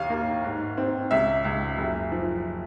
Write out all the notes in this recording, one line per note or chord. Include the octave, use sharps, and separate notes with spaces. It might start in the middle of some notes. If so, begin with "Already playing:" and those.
Already playing: D#2 F5
A#3
G#2
C4
C#2 E5
C#2
F#1
F3